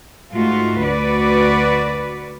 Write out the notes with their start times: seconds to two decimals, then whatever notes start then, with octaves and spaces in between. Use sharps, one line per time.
0.32 G#2 A3 F4 F#4
0.83 D2 F#4 B4 D5